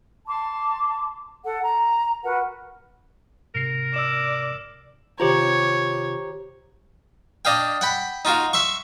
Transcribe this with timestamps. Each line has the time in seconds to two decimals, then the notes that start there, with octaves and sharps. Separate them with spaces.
0.28 A5 C6 D6
1.45 A4 F#5
1.63 A#5
2.23 F#4 A#4 B4 F#5
3.55 G#2 C3 A#4 C7
3.94 D5 E6 E7
5.20 C3 D#3 F4 G4 C5 C#5 A#5
7.45 D4 D#5 F5 G5
7.81 F#5 G5 B5
8.25 D#4 F4 F#4 F5
8.53 E5 C6 C#6